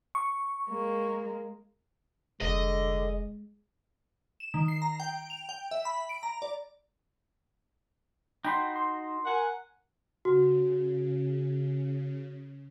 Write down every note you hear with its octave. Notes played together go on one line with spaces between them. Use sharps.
C#6
G#3 A#3
F1 D3 G#3 D#5
E7
D#3
C7
A#5
G5
F7
G5
E5
B5
D7
A#5
D5
D#4 F#4 G5 B5 C6
C6
A#4 F#5 G#5
C#3 F#4